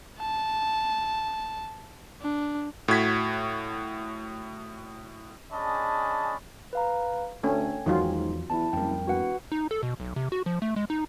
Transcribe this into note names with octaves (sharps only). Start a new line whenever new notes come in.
A5
D4
A2 F#4 G#6 B6
C#4 D4 G#4 D#5 A5 B5
B4 F5 A#5
D2 A3 C#4 G5 G#5 G#6
E2 G#2 D#3 F3 F#3 F4
E2 E4 A5
F#1 F2 G3 A#4 G5
E1 F#4 B4 F#5
D#4
A4
B2
B1
C3
F#4
F3
A3
G#3
D#4